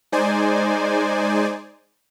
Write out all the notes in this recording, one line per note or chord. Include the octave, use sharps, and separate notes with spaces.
G#3 D#4 C5 D5 G#5